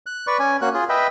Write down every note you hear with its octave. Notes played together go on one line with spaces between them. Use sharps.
F#6
B4 D5 C#6
C#4 G#5
A#3 C#4 F#4 F#6
F4 G#4
B4 D#5 E5 G5